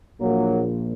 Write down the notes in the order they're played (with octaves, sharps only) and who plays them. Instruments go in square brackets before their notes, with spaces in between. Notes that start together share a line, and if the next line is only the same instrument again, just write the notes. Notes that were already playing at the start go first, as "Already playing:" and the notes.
[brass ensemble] A#1 A#2 F#3 A#3